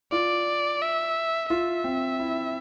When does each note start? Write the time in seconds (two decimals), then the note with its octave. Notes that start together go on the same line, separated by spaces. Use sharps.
0.12 F4 D5
0.82 E5
1.50 F4 E5
1.84 C4
2.19 E4